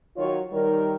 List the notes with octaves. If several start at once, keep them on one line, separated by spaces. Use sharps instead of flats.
D#3 F#3 F4 C#5
D#3 G3 A#4